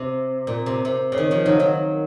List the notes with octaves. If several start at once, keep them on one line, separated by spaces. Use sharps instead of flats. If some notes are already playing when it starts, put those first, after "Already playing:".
Already playing: C3
A#2
C3
C3
C#3
D#3
C#3 F3
D#3 F#3
D#3 F#3